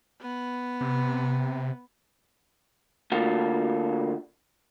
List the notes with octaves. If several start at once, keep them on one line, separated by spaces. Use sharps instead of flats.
B3
C3
D3 A3 A#3 F4 F#4